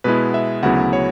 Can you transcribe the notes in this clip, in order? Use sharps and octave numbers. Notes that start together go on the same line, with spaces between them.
B2 G#3 B3 E4 B4
E5
D2 C#3 F#3 B3 E4 F#5
C#5